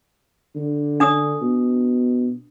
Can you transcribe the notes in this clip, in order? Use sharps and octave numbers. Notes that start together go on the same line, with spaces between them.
D3
D4 D#6
B2